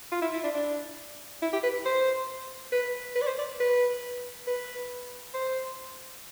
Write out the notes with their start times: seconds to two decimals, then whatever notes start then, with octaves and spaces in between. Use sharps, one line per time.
0.12 F4
0.22 E4
0.33 E4
0.44 D4
0.54 D4
1.42 E4
1.53 G4
1.63 B4
1.86 C5
2.72 B4
3.16 B4
3.22 D5
3.27 C5
3.39 D5
3.60 B4
4.47 B4
5.34 C5